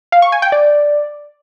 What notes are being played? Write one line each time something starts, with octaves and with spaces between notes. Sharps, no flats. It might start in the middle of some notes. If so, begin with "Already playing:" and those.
F5
C#6
G#5
G5
D5